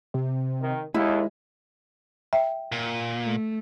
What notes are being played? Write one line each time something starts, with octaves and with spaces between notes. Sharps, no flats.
C3
D#3
D#2 G#3 E4
E5 G5
A#2
A3